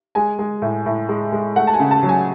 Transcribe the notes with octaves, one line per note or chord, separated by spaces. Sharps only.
G#3 G#5
G#3
A2
A2
G#3
G#3
A3 F#5
A5
G#5
C#3
A5
F#3
G#5